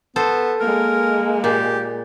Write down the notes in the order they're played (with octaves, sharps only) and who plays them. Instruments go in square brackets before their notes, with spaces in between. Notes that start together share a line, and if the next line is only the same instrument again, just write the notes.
[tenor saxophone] B3 [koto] A4 C5
[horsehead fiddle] G#3 A#3 [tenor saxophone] A#4
[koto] A#2 [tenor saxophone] G4